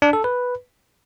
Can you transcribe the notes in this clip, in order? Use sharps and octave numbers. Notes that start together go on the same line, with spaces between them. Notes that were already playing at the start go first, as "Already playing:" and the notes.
D4
A4
B4